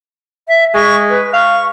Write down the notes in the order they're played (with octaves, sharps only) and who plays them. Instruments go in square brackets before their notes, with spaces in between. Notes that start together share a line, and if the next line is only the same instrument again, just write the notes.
[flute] E5
[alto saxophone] G#3 [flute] C#6
[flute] B4
[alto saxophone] F5 [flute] C#6